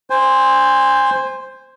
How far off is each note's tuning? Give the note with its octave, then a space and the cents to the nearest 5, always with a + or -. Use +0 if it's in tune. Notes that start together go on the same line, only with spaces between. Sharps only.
C5 +0 G#5 -30